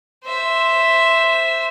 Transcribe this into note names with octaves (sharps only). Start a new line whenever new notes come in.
C5 E5